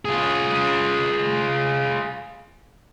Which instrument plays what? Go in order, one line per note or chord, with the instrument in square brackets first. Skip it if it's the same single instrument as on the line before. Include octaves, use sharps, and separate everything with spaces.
[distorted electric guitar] F4 G#4